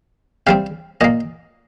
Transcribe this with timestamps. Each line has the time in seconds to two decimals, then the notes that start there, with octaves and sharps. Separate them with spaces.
0.47 C3 G3 C4 F5
1.01 A#2 A#3 D#5